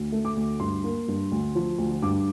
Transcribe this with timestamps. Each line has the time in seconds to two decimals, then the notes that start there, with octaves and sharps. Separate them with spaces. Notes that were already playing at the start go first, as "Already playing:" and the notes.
Already playing: D2
0.12 A3
0.25 D6
0.36 D2
0.60 G2 C6
0.84 A#3
1.08 G2
1.31 D2
1.55 F3
1.78 D2
2.02 G2 D6